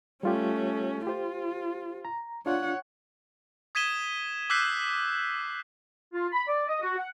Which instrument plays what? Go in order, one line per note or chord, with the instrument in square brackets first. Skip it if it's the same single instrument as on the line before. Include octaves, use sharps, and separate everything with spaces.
[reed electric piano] G3 F4 G4 [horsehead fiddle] A3 C#4
[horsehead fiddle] F4 [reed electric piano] G4 C5
[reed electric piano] A#5
[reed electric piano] D4 F4 [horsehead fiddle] C#5 F#5
[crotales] D#6 G#6 B6 D#7 E7 G7
D6 E6 F#6 G6 B6 C7
[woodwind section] F4
B5
D5
D#5
F#4
F#5